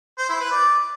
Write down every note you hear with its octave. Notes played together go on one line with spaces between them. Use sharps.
C5
E4
B4
D5